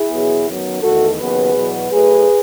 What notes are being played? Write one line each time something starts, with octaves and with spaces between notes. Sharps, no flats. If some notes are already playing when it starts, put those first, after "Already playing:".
Already playing: E4 G#4
E2 B2 F#3 B3
F#2 D#3 F#3 B3
E2 D#3 A3 F#4 A4
D#2 C#3 F#3 B3 G#4 B4
E2 B2 F#3 B3
A2 F#3 A3 G#4 B4